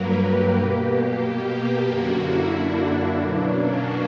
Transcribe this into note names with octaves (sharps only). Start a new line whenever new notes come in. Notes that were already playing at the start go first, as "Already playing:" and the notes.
Already playing: G2 F#3 A#3 A#4 B4
G4
B2 A#3
F#2 D3 A#3 F#4
E4
D4
B2 F#3 A#3 D4
C#4